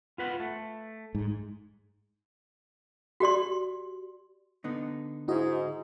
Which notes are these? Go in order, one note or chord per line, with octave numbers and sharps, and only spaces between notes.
F4 B4 F#5
A3
G#2
F#4 G4 D5 C6
D3 B3 D#4
G#2 E4 F#4 D#5